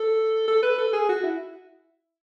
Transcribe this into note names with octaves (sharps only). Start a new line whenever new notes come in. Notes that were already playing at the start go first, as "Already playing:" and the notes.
Already playing: A4
A4
B4
A4
G#4
F#4
E4